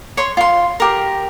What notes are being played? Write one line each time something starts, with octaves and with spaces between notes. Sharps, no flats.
C#5 C6
F4 C6
G4 A#4